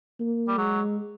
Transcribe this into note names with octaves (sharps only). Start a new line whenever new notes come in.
A#3
G3
F#3 G#3